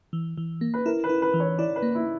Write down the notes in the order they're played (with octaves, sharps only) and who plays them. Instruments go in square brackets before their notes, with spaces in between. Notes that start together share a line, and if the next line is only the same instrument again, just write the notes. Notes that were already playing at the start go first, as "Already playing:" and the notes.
[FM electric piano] E3
E3
A#3
[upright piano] B4
[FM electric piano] E4 [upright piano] A#4
[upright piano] B4
[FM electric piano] E4
[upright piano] B4
[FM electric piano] E3
[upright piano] C#5
[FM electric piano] E4 [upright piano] D5
[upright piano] B4
[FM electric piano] A#3
[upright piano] E4